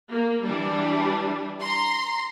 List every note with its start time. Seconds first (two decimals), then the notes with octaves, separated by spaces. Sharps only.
0.10 A#3
0.44 E3 G3 D4
1.61 A#5 C6